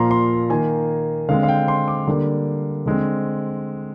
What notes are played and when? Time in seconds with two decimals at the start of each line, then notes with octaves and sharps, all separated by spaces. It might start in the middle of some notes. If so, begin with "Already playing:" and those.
Already playing: A#2 F3 A#3 A#5 C6
0.11 C6
0.50 D#3 A#3 G#5
1.28 D3 G#3 C4 F5
1.43 F5
1.48 G5
1.68 C6
1.88 D6
2.07 D3 G3 A#3
2.86 D3 G#3 C4